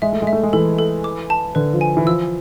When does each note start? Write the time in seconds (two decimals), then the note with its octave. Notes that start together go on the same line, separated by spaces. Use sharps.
0.02 G#3 E5
0.12 A3
0.22 G#3
0.27 E5
0.33 A3
0.43 G#3
0.53 E3 A4
0.79 A4
1.04 D6
1.30 A5
1.55 D3 B4
1.73 F3
1.81 G#5
1.97 E3
2.06 F3 E6